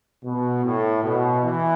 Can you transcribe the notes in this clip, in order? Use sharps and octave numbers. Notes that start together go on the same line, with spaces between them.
B2
A2
B2
E3